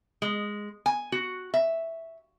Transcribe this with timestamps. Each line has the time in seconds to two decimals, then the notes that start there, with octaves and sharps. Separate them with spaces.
0.22 G#3
0.86 G#5
1.12 F#4
1.54 E5